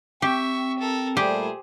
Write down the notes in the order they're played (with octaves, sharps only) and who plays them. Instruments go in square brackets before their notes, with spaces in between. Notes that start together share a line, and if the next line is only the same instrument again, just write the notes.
[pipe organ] C4 [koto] G4 [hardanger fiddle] E5 C#6
[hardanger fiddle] A4 A#4
[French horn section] A#2 G3 A3 [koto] G4 [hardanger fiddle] G#4 C5